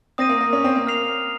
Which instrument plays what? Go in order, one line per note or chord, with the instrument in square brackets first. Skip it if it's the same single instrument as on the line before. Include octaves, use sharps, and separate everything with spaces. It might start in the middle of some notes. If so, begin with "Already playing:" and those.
[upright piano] C4 [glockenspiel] D#6 A#6 D#7
[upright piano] A#3
A#3
C#4
C4
A#3
[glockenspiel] F6 C7 F7